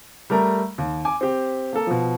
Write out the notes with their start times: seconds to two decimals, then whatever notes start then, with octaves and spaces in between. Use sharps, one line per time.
0.30 G3 A3 A#4 A#5
0.78 D#2
1.05 G#5 D6
1.21 C4 G4
1.73 A#3 A4
1.87 B2 F3